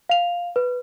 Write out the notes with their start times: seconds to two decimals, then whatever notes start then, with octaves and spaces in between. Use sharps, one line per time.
0.09 F5 F7
0.56 B4